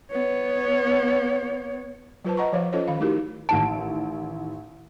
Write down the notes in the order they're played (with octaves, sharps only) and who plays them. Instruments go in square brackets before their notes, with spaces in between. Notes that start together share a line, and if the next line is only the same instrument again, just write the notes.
[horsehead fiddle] B3 C#5
[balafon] F#3 F4 B4 C5 A5
D#5 F#5 A#5 C#6
F3 C5 C#5 F5
C#4 F4 A4 C5 C#5 D#5
D#3 F5
A3 D#4 E4 F#4 G4 A#4
[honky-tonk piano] A1 D#3 D7 [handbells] A5